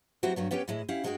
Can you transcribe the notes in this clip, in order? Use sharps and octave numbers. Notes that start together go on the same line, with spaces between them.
E3 F#3 C4 E4 F#4 G4
G2 F#3 B3
B3 C#4 G4 B4 C#5 G5
A2 E3 G#3 E4
C#4 E4 G4 F5 F#5
G2 G#3 C#4 F#4 G#4 G5